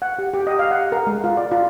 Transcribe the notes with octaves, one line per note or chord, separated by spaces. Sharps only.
F#5
G4
G4
D#5
F5
F#5
A#4
G#3
F4
D5
F4